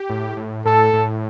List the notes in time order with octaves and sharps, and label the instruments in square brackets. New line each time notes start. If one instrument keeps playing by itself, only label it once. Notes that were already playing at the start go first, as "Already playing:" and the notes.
Already playing: [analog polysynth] G4
A2
A2
[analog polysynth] A2 [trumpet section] A4
[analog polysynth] A2